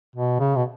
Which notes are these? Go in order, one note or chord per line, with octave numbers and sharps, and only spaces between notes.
B2
C#3
B2